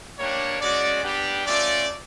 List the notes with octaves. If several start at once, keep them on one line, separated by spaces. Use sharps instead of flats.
G3 A#3 D4 G4 C#5
G#3 C#4 F#4 D5
G3 B3 D4 G4
A3 C#4 F4 D5